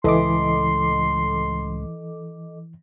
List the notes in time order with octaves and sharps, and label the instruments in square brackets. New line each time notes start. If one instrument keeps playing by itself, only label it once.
[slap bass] C#2 A2 [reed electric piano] E3 [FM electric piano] A4 D#5 D6 [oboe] C6